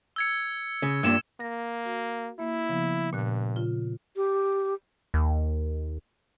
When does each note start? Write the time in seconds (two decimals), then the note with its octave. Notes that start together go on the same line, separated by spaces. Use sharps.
0.16 E6 G#6 C#7
0.82 C#3
1.03 G2 A#2 E6 E7
1.40 A#3 A#6
1.85 F#4
2.39 A#3 E4 E5
2.69 C#3 F3 B3
3.13 G2 A#2 D6 F#6
3.56 C#3 F4
4.16 G4
5.14 D#2